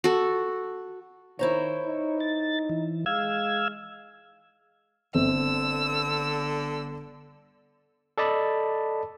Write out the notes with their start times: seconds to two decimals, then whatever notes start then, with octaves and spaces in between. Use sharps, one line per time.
0.04 F#4 A4
1.39 D#3 E4 C5 C#5 A#5
1.85 D#4
2.20 A6
2.69 E3
3.06 G#3 F5 E6 G#6
5.15 G1 D3 C4 E6
8.18 A4 D5 D#5 A5 B5